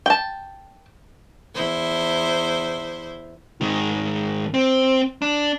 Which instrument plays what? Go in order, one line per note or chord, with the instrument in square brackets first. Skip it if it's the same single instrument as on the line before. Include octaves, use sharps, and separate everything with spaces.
[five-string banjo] G5 A5
[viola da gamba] E2 E4 C5
[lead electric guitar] G#2 D#3
C4
D4